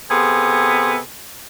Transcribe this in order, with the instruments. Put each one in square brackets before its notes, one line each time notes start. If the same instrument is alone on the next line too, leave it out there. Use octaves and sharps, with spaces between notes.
[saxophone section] C3 B3 G#4 A4